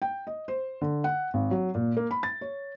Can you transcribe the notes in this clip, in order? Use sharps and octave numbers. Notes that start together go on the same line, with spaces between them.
G5
D#5
C5
D3
F#5
G#1
F#3
A#2
A#3
B5
A6
C#5